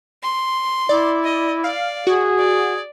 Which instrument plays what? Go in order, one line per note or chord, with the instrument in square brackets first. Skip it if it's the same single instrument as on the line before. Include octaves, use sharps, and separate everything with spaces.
[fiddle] C6
[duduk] E4 [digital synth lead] D5
[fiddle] D#5
[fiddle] D5 [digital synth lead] F5
[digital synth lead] F#4 [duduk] G#4
[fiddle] D5